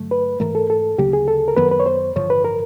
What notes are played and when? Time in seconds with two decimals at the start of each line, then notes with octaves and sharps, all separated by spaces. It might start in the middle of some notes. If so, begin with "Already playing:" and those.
Already playing: G2 D3 F#3 A3
0.11 B4
0.40 G#2 E3 A3 A#4
0.55 A4
0.70 A4
0.98 D2 C#3 F#3 A#3 G4
1.13 G#4
1.28 A4
1.48 A#4
1.57 F#2 D#3 F#3 B3 B4
1.71 B4
1.80 C#5
1.86 C5
2.16 A1 G2 D3 F3 C#5
2.30 B4
2.45 A#4